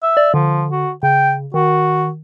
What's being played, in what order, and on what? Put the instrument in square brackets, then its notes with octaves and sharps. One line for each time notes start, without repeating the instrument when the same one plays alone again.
[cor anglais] E5
[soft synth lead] D5
[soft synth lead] D3 [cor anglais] F3
[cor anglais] F#4
[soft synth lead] C#3 [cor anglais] G5
[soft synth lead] D#3 [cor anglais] F#4